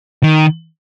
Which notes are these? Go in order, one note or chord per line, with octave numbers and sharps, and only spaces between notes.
D#3